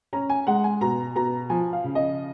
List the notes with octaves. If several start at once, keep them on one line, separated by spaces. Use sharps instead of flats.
C#4 A#5
G#5
G#3 F#5
G#5
B2 A#5
B2 A#5
F3 G#5
F5
C#3
D#5